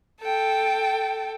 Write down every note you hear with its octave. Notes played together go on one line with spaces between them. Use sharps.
A4 G5